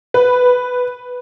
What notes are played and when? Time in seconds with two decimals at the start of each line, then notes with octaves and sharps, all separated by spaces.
0.14 B4